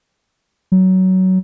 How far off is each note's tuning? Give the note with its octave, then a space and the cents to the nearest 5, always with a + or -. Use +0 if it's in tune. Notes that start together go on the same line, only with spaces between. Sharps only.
F#3 +15